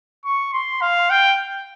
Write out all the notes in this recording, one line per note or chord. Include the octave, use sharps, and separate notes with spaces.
C#6
C6
F5
G5